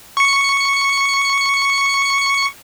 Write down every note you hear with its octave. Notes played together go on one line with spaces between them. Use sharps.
C#6 C#7